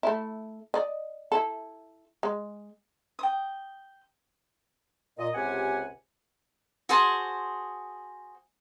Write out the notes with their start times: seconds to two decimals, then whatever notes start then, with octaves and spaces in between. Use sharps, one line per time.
0.03 A3 E4
0.74 D5 D#5
1.32 E4 A4
2.23 G#3
3.19 G5 D#6
5.18 A#2 D#5
5.34 C#2 C3 G4 F#5 G#5
6.89 F#4 G#4 C5 A5